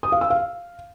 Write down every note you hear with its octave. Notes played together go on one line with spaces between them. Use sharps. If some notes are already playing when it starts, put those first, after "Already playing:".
D#6
F5
E6
F5